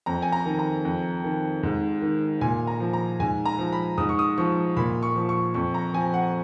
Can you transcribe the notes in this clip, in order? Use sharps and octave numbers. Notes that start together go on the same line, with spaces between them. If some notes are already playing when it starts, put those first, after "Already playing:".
F2 A#5
G#5
A#5
D#3
A#5
F2
D#3
G#2
D#3
A#2 G#5
A#5
F3
A#5
G#2 G#5
A#5
F3
B5
G#2 D#6
C#6
D#6
F3 C#6
A#2 B5
C#6
F3
C#6
F2 C#6
A#5
F3 G#5
F#5